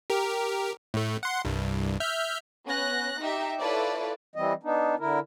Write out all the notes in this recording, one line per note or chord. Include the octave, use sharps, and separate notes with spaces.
G4 A#4
A2 A3
F#5 C6
C2 G2
E5 F6 G6
B3 C#4 F#6 A#6
D#4 G4 E5
E4 F4 A4 B4 C#5 D5
E3 G3 C4 D#5
B3 D4 D#4
D3 E4 A#4